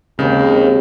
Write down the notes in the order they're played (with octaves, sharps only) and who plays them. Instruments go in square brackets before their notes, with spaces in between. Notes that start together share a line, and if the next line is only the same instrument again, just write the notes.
[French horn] D#2 [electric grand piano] C#3 [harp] G#3 C4